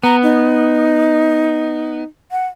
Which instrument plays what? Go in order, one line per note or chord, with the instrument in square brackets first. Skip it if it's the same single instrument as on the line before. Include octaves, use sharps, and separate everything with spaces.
[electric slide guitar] B3 [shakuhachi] A#5
[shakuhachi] D#4
F#5